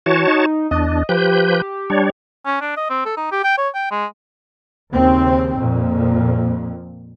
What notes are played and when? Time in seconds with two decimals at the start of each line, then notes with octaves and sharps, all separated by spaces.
0.06 E3 F#4 C#5 A5
0.27 D#4
0.71 E2 D4 D#5
1.09 F3 G4 B4 G6
1.90 G3 D4 C#5
2.46 C#4
2.61 D4
2.77 D#5
2.90 C4
3.05 A4
3.17 D#4
3.32 G4
3.44 G5
3.58 C#5
3.74 G5
3.91 G#3
4.92 D#2 C#3 C4
5.56 F2 A#2